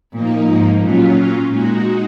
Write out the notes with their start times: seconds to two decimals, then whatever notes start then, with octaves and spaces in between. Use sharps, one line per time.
0.13 A#2 F3 A#3 D#4
0.47 G#2
0.81 A#2 F#3 C#4 F4
1.49 A#2 G#3 D#4 F#4